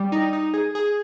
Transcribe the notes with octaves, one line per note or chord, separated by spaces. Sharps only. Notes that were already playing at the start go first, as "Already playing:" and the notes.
Already playing: G3
D#4
D#4
G#4
G#4